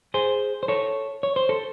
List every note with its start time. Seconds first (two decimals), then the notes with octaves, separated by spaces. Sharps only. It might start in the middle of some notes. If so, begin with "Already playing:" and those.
0.14 G#4 C5
0.63 C5
0.68 A4 C#5
1.23 C#5
1.36 C5
1.49 A4